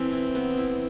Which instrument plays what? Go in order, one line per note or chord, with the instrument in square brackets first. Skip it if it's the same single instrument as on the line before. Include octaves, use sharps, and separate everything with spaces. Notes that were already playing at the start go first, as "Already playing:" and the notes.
Already playing: [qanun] E3 B3 A4 [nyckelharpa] C4
[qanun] E4
B3
E4